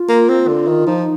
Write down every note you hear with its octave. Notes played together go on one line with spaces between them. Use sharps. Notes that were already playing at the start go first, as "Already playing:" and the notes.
Already playing: F4
A#3
C4
D3
D#3
F3 D#4